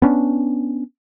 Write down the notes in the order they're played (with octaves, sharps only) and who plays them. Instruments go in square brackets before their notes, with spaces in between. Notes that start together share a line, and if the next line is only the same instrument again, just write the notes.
[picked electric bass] B3 C#4 D4